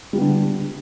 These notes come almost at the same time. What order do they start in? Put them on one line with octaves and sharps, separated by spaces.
G3 B3 D3